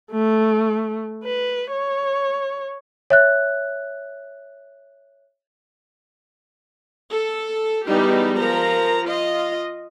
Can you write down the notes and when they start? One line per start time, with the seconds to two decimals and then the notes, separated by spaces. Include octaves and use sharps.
0.11 A3
1.24 B4
1.72 C#5
3.10 C#5 E5 F#6
7.10 A4
7.87 E3 G3 G#3 B3 D#4 G4
8.38 F3 A#4 A#5
9.05 F4 D#5